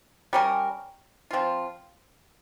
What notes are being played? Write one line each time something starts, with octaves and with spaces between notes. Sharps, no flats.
G3 C#4 G4 A#4
F3 C4 F4